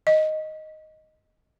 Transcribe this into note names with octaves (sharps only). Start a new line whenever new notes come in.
D#5